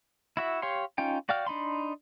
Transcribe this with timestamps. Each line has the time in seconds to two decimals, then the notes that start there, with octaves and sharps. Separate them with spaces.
0.37 E4 F#4 E5
0.62 G4 C#5 F5 C6
0.98 C#4 D#4 F4 G5
1.29 F#4 D5 F5 G5 F6
1.47 D4 D#4 B5 C6